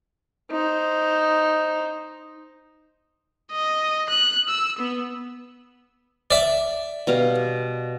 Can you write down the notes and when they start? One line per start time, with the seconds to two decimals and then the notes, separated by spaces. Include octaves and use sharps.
0.50 D#4 C5
3.51 D#5
4.10 F#6
4.49 E6
4.79 B3
6.31 D5 E5
7.07 B2 G3 F5